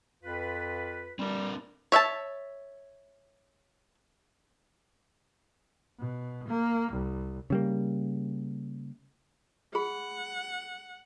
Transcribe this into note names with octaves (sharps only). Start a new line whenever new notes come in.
F2 F4 B4
G3 C4 D4 A#4
C#5 E5 F#5 A5
B2
A#3
C2
C#3 G3 A#3
G#4 F#5 B5